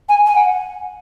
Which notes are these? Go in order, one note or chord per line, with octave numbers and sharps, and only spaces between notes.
G#5
G#5
F#5